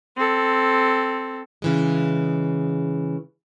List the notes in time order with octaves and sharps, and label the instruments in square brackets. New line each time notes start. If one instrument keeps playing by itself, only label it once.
[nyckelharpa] C4 A4
[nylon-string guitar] C#3 E3 G#3